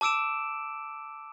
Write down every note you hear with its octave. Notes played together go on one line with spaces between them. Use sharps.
A5 D6 E6 D7 E7